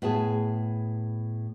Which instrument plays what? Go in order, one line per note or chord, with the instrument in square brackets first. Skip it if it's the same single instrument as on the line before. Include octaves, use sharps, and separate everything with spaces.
[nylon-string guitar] A2 B3 G#4 A5